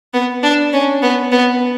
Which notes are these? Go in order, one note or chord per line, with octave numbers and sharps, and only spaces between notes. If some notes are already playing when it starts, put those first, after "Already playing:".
B3
D4
C#4
B3
B3